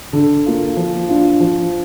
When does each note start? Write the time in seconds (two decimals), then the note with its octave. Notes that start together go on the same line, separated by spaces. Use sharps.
0.13 D3
0.46 A#3 F4
0.77 F3
1.09 D4 F4
1.40 F3